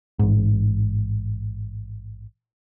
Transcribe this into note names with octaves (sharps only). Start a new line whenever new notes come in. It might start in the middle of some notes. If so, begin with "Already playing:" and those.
A1 G#2